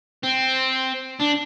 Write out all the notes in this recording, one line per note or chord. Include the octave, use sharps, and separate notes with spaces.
C4
D4